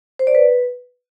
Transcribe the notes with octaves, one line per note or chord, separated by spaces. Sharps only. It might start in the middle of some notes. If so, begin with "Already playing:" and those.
C5
D5
B4